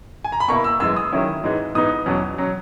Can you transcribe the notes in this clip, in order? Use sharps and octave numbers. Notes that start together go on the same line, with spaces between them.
G#5
A#5
B5
B2 A#3 E4 C#6
E6
F#2 E3 G#3 E6
D#6
D#3 F#3 C#4 E4
G#2 E3 G#3
G#2 E3 B3 D#4 D#6
E2 B2 F#3 C#4
F#3 C#4